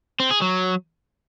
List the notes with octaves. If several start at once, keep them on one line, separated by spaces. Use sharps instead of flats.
C4
G#4
F#3